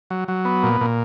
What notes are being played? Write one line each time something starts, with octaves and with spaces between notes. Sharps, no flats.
F#3
F#3
B3
A#2
A#2